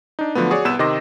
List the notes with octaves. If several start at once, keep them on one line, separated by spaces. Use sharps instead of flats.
D4 D#4
D3 F3 F#3 A3 B3
F#4 G#4 C#5 D5
C2 B3 B4 E6 E7
C3 D#3 D#5 C6 D6 A#6